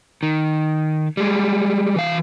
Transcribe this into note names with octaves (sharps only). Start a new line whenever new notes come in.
D#3
G3 G#3
E3 F5